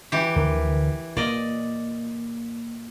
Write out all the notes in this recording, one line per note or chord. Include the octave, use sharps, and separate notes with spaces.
E3 G4
D2 D3 F3 A#4 B4
A#2 A#3 F4 D5 D#5